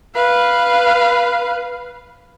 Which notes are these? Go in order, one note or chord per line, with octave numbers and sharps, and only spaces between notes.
B4 F5